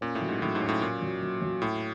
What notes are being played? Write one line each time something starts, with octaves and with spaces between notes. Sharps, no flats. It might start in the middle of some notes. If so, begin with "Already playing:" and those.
A#2 C#4
A2
F#3
G#2
A2 F#3
G#2
C#4
A2
A#2 A#3
F#3
F#3
F#3
A2 F#4